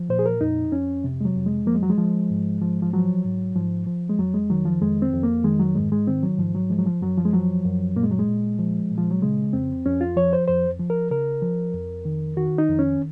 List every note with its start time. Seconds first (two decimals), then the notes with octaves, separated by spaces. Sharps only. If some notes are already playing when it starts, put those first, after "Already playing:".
Already playing: F3
0.09 A#2 C5
0.19 G#4
0.26 A#4
0.40 F2 D#4
0.72 F2 C#4
1.04 C3
1.21 G#3
1.25 F#3
1.35 F2
1.46 G#3
1.66 F3 A#3
1.75 G#3
1.83 F#3
1.90 G#3
1.98 F3
2.30 G#2
2.61 F3
2.82 F3
2.93 F3 F#3
3.25 G#2
3.55 G#2 F3
3.87 F3
4.10 G#3
4.19 F2 F#3
4.34 G#3
4.50 D#3 F#3
4.65 F3
4.81 F2 G#3
5.02 C4
5.14 F2
5.23 A#3
5.44 D#3 G#3
5.60 F#3
5.75 G#2 G#3
5.92 G#3
6.07 D#3 C4
6.23 F#3
6.38 G#2 F3
6.55 F#3
6.70 F3 G#3
6.79 F#3
6.86 F3
7.02 F#2 F#3
7.17 F3
7.25 G#3
7.33 F3 F#3
7.65 F#2
7.96 A#2 A#3
8.03 G#3
8.11 F#3
8.19 G#3
8.27 A#2
8.59 F3
8.91 A#2
8.98 F3
9.10 F#3
9.22 C#3 G#3
9.53 F2 C4
9.86 F2 C#4
10.01 F4
10.17 F3 C#5
10.33 C5
10.48 F2 C5
10.79 F3
10.90 A#4
11.11 C#3 A#4
11.42 F3
11.74 F2
12.05 D#3
12.37 D#3 F#4
12.58 D#4
12.69 F2
12.79 C#4